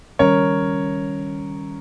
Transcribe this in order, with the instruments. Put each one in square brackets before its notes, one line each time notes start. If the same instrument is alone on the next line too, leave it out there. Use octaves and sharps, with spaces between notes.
[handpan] D#3 G3 C#4 [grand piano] A#4 C#5